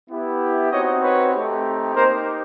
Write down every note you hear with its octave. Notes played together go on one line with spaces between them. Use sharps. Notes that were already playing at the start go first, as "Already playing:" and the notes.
B3 E4 G4
C4 D#4 F#4 C#5 D#5
B4 C#5
A3 C4 D#4 G4
A#3 D#4 G4 A#4 C5